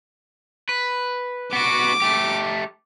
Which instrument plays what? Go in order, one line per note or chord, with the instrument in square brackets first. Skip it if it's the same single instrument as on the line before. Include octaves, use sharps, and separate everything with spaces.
[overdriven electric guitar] B4
[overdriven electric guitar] B3 F#4 [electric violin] D6 D7
[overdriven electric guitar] A3 G4